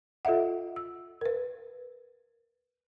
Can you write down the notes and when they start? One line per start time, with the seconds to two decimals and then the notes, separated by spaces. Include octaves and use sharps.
0.25 F4 A4 D#5 E5 F#5
0.76 E6
1.21 A#4 B4